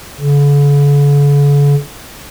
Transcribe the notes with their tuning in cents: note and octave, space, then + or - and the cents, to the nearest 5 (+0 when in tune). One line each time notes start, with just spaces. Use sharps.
D3 -45